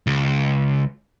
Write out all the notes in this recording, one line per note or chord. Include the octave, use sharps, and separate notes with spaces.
C#2